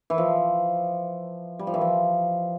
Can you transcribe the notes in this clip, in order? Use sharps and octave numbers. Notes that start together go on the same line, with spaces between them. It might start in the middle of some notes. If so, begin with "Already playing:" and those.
E3
F3
G3
F3
E3
F3